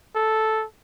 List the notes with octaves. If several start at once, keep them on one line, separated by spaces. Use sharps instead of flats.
A4